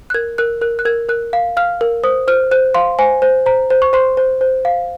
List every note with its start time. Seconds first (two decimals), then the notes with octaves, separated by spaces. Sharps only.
0.10 F#6
0.14 A#4 G#6
0.38 A#4 F#6
0.61 A#4 F#6
0.79 F#6
0.85 A#4 G#6
1.09 A#4 F#6
1.33 F5
1.57 F5 F6
1.81 A#4
2.03 C5 D#6
2.28 C5 F6
2.51 C5 F#6
2.74 F5 C6
2.99 C5 G#5
3.22 C5
3.46 C5 A#5
3.70 C5
3.82 C#6
3.93 C5 C6
4.17 C5
4.41 C5
4.65 F5